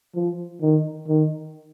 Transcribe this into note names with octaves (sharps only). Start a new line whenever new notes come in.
F3
D#3
D#3